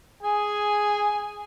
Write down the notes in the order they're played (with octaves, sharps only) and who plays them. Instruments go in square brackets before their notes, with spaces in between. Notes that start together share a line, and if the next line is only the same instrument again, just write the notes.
[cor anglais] G#4 [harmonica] G#5